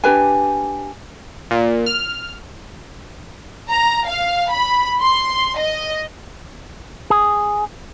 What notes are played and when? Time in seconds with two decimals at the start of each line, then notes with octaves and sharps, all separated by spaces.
0.04 D4 G4 B4 G#5
1.51 A#2
1.86 F6
3.68 A#5
4.06 F5
4.49 B5
5.02 C6
5.58 D#5
7.10 G#4